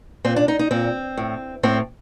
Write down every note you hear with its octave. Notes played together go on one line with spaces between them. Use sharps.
A#2 C4
D4
D#4
D#4
A#2 C4
A2
A2 C4